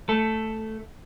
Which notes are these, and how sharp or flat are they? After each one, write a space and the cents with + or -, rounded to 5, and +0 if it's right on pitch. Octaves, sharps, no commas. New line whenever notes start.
A3 +0 A4 +0